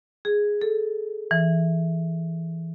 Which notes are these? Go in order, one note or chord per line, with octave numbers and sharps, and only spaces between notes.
G#4
A4
E3